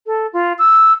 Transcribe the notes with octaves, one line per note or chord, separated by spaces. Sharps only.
A4
F4
E6